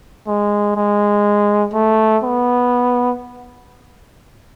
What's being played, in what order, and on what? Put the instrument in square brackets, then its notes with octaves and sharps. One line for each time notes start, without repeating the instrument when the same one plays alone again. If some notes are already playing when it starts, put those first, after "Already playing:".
[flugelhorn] G#3
G#3
A3
B3